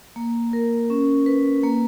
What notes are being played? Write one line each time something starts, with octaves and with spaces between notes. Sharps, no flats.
A#3
A#4
C#4
B4
A#3